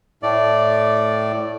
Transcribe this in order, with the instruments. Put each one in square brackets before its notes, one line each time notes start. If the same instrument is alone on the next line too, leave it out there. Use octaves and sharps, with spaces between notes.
[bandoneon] A2 A3 D5